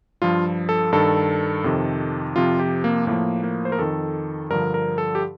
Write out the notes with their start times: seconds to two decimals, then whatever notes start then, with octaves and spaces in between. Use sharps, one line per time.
0.22 G2 F3 F4
0.69 A4
0.92 G2 D#3 A4
1.64 F2 C3 D#3
2.36 F2 C3 F3 F4
2.59 G4
2.84 A#3
3.07 A2 F3 A#3
3.43 A#3
3.65 C5
3.72 A#4
3.79 F2 D#3 A4
4.50 G2 D3 F3 A#4
4.74 A#4
4.98 A4
5.15 G4